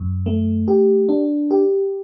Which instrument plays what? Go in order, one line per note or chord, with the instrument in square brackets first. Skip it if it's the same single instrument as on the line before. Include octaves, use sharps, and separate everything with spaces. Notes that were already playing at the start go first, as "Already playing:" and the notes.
Already playing: [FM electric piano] F#2
A3
G4
D4
G4